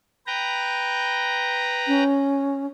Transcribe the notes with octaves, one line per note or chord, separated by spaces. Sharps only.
B4 G5 A#5
C#4